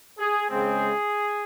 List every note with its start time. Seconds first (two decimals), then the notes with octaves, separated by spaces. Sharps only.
0.18 G#4
0.48 C#3 G#3 C4 G#4